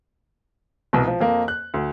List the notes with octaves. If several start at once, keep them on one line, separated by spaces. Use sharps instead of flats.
C2 B2
F3
F2 A#3
F#6
D2